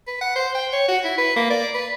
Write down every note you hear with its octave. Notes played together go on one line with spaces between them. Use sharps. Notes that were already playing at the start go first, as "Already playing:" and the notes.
B4
F#5
C5
G5
C#5
F#4
E4
B4
A#3
D5
B4